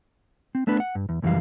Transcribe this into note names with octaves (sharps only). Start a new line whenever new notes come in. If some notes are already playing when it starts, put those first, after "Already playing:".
C4
A3 B3 D4 B4
F#5
G2
E2
C#2 F#2 E3 F3 G3 F5